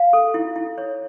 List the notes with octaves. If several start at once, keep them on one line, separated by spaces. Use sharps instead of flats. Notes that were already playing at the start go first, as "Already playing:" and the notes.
Already playing: F5
A4
E4
E4
C#5